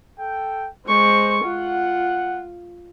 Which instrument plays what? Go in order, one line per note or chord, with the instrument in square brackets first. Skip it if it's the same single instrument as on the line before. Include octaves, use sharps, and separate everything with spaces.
[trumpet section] A4 G5
[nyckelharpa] G#3 C#6 [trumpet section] C5
[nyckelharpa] F4 [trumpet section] F#5